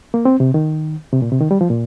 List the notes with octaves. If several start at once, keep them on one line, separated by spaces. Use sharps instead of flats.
A#3
C4
C3
D#3
C3
A#2
C3
D#3
G3
F3
A#2